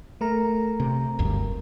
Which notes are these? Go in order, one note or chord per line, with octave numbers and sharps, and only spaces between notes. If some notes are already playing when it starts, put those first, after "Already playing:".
A3 A#4 A#5
C3
F#1 D2 G2